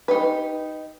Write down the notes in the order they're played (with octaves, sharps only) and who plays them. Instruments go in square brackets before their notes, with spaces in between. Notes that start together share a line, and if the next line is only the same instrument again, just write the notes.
[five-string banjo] D#4 G4 B4